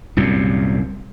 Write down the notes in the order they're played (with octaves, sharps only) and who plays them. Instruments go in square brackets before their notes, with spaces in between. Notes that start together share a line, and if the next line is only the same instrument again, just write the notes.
[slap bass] C2 F#2 A#2